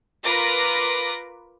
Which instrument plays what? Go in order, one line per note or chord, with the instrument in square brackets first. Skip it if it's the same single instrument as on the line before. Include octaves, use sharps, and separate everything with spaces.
[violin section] F4 A#4 B4 D6 A#6